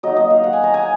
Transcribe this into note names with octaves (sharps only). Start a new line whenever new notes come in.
F#3 A#3 D#4 D#5
D#5
F5
F#5
G#5
A#5
G#5